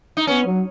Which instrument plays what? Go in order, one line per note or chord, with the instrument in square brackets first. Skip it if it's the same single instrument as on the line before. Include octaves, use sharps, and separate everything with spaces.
[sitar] D#4
[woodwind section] B3 [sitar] C#4
[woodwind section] F#3